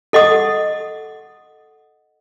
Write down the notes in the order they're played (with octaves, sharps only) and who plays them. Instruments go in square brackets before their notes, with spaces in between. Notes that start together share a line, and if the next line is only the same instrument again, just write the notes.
[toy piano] A4 D#5 F#5 D#6